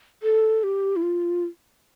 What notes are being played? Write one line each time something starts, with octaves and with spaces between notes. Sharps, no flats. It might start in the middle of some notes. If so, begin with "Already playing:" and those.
A4
G4
E4
F4